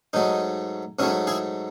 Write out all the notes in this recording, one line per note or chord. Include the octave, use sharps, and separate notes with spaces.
G#2 F#3 A3 D#4
G#2 F#3 A3 C#4 E4
E4 G#4